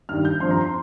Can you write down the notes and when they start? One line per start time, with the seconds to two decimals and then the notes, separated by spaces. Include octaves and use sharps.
0.09 G2 D#3 G3 F6
0.25 G6
0.40 G2 F3 C4 C6
0.51 A#5
0.61 C6